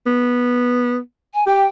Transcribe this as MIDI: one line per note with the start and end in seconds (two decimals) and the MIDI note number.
0.06 0.98 59
1.34 1.46 80
1.47 1.65 67
1.47 1.66 79